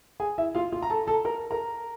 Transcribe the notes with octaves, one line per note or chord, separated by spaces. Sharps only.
G#4 G#5
E4 E5
F4 F5
F4 F5
A#5
A4 A5
A4 A5
A#4 A#5
A#4 A#5